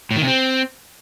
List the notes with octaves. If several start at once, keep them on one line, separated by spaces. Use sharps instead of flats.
A2
D#3
C3
C4